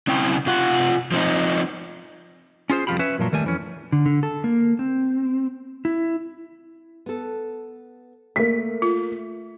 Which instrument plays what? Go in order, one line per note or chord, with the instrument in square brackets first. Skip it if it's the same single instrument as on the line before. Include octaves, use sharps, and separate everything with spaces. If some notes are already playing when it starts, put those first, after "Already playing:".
[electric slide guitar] C#3 C4 E4 G5
C3 F4 F#5
F3 C4 D#4
[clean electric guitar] C#4 F4 G#4 C5
C2 F2 F3 F4 G4 B5
C#4 B4 C#5 E5
F#2 A#2 F3 F#3
D#2 D#3 G3 A3 G#5
F2 E3 C#4
[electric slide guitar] D3
D3
A4
A#3
C4
E4
[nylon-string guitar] B3 A4
[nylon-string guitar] A3 [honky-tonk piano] A#3 B6
[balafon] F4